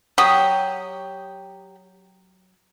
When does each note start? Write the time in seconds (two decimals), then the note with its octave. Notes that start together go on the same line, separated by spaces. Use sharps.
0.18 F#3 G4 D#6